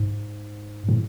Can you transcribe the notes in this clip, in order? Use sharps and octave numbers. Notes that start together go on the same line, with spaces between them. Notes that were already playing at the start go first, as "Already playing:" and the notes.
Already playing: G#2
A2